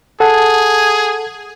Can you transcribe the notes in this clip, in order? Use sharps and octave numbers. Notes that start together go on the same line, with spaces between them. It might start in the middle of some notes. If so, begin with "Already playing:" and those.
G#4 A4 F#5 A5